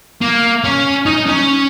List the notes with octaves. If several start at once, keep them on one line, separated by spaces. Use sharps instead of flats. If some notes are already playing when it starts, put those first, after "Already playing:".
A#3
C#4
D#4
C#4